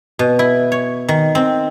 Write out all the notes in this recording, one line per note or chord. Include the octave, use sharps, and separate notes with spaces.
B2
E4
C#5
D#3
C4